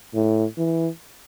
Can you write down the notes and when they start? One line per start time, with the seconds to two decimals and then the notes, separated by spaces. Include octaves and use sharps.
0.15 A2
0.58 E3